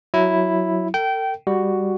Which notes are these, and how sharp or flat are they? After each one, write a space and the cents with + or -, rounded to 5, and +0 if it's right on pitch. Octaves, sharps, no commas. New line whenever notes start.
F#3 -5 E4 +0
A4 +45 G5 -20
G3 +10 F#4 +5